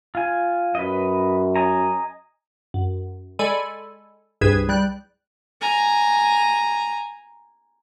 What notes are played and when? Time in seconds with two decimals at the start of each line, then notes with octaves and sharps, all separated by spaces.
0.15 F4 G#5
0.75 F#2 B4 D#5
1.56 D#5 G#5 A#5
2.74 F#2
3.39 G#3 A4 D5 G#5 B5 D#7
4.41 C2 G2 G#4 B4 G#6 E7
4.69 G3 D5 F#6
5.61 G#5 A#5